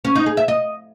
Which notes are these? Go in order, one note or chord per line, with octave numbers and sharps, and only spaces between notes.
C#4
D#4
G#4
E5
D#5